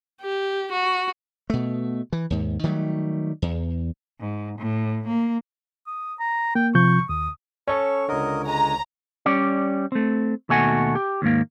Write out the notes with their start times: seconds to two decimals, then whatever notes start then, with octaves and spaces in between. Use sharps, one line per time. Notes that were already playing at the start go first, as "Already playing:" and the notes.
0.22 G4
0.72 F#4
1.50 B2 A3
2.13 E3
2.30 D#2 G#2
2.63 D#3 F#3 G3 A3
3.42 E2
4.20 G#2
4.59 A2
5.07 A#3
5.87 D#6
6.19 A#5
6.55 A#3 G5
6.75 C3 F3 C#6 G6
7.09 D#2 D#6
7.68 C#4 A4 C#5 C#6
8.09 C#2 D3 A#4 D#5
8.47 G#3 G#5 A#5
9.26 G3 C#4 D5
9.92 A3 C4
10.49 D#2 B2 A3 F#4 G#5
10.95 G4
11.22 D#2 G#2 A#3